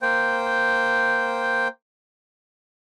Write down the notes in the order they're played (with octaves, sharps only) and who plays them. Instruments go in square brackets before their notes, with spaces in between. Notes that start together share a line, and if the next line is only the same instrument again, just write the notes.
[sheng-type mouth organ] A#3 C5 G5